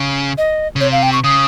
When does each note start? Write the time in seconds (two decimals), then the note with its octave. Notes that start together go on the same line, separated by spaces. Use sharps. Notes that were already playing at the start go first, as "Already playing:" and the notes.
Already playing: C#3
0.38 D#5
0.76 C#3
0.81 C3 C#5
0.92 F5
1.03 G5
1.13 C#6
1.24 C#3 D#6